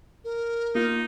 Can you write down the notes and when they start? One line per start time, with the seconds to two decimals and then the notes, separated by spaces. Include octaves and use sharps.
0.24 A#4
0.75 A#3 D#4 F4